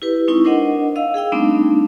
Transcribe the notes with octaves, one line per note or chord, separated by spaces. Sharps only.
E4 G4 B4
G#3 C4 D#4 E4 C#6
D4 A#4 C5 D#5 F#5
D#5 F5 E6
G#4 F5 G5 E6
G3 A3 B3 C4 D4 D#4